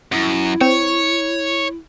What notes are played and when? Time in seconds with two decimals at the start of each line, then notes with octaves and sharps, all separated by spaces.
0.12 F#2 E4
0.61 C4 C#5